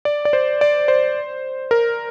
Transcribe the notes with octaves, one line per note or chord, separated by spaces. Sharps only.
D5
D5
C5
D5
C5
A#4